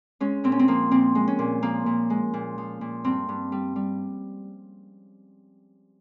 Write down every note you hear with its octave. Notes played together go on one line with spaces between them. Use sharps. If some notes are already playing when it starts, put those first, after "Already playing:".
G#3 C#4
A#2 C4
C#4
C4
F3 A#3
A#2 C4
G#3
C#4
A#2
F3 A#3
A#2
G#3
A#2
F3
A#2
G2 C4
G2
G3
G3